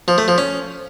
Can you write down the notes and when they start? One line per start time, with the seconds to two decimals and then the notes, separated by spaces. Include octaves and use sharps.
0.08 F3
0.18 A3
0.28 F3
0.38 C#4